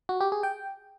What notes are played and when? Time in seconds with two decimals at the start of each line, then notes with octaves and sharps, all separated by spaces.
0.09 F#4
0.21 G4
0.32 G#4
0.43 G5